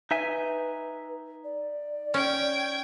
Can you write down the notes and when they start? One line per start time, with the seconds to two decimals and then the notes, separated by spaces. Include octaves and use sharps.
0.11 D#4 B4 E5 G#5
1.44 D5
2.14 C#4 G5 G#6